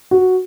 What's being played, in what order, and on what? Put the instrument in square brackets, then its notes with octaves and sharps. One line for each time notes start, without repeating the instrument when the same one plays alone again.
[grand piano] F#4